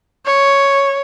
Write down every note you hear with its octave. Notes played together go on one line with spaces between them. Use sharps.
C#5